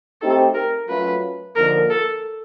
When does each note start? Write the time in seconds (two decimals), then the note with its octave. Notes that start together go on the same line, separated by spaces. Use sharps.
0.21 A3 C4 D#4 G4 A4
0.54 A#4
0.89 F#3 A3 C#4 F4 B4
1.56 D3 F3 A#3 D#4 A#4
1.90 A4